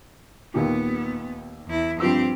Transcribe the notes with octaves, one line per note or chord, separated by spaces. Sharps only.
D#2 A#2 B3 G4
E2 E4
G2 F3 C4 G4 E6